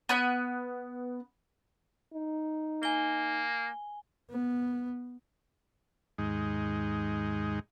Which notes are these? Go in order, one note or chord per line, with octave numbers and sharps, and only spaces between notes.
B3 B5 F#6
D#4
A#3 G#5 G7
B3
D#2 G#2 G#3 D#4